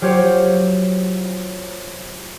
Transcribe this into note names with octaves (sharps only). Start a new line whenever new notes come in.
F#3 F4 G4 C5 C#5